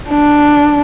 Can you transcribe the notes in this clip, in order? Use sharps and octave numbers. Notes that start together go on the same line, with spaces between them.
D4